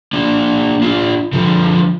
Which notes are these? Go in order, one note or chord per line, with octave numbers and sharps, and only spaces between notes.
A#3 D4
D4 F4
D3 F3